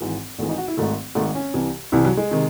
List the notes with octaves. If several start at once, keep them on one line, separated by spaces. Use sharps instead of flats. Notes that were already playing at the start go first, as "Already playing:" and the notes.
G#1 G#2 E3
G#1 G#2 E3 A3
D#4
F#4
E4
G#1 G#2 D#3 A3
G#1 G#2 D#3 A3
C#4
C2 C3 E3
C2 C3 E3 E4
F#3
G#3
C3 D#3